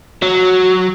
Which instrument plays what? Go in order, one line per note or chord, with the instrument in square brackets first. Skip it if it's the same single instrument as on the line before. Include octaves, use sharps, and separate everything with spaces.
[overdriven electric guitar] F#3